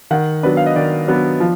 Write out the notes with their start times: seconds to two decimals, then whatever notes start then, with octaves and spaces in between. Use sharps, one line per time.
0.11 D#3 F#5
0.43 F#3 B3 D4 B4
0.57 F5
0.66 D#5
0.76 D#3 D5
1.08 F#3 B3 D4
1.40 F3